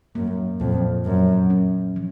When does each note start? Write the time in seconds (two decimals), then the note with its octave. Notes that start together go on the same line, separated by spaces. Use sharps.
0.15 F#2 A#3
0.60 F2 A#2
1.05 F#2 F3
1.50 C#4
1.96 F3